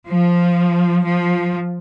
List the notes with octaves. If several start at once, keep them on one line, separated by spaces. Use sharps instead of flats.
F3
F3